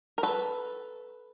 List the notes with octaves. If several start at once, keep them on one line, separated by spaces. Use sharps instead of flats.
A#4
A4 B4